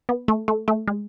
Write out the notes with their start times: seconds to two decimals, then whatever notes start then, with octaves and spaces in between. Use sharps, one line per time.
0.09 B3
0.28 A3
0.48 A3
0.68 A3
0.88 G#3